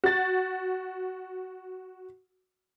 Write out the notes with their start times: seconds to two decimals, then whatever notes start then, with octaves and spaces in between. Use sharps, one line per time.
0.04 F#4 A6